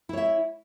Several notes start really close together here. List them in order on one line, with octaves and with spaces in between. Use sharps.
E4 C#5 E5